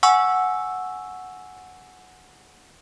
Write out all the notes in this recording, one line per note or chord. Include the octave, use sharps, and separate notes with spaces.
F#5 G#5 C#6 E6